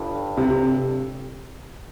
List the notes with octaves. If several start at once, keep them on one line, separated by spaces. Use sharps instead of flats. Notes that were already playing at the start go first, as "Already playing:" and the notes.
Already playing: G1 G2
C3